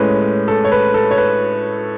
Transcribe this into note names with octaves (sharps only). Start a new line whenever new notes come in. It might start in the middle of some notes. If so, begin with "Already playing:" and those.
Already playing: A2 G#3 C#4 B4
A4
C#5
B4
A4
C#5
B4